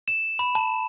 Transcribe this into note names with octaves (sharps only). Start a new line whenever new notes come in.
E7
B5
A5